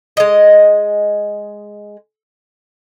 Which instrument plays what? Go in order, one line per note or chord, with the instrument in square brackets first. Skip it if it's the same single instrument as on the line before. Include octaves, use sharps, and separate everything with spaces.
[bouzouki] G#3 D#5